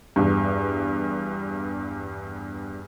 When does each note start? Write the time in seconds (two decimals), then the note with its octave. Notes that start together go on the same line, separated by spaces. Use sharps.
0.16 E2 G2